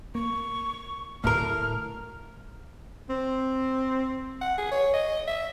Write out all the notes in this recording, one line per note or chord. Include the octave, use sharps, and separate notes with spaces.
A#3 C#6
D1 A2 A#4 F6
C4
F#5
G#4
C#5
D#5
E5